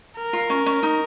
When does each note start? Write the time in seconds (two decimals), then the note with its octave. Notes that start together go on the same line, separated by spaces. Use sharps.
0.17 A#4
0.33 F4
0.50 C#4
0.66 C#4
0.83 D#4